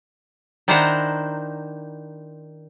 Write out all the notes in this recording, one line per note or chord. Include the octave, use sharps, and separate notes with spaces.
D#3 D4 E4 C5 F#5 A#5